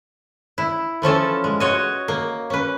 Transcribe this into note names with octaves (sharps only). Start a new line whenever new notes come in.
E4
E3 F3 C#4 A4
G#3
F#4 C#5 D#5
A#3
C#4 B4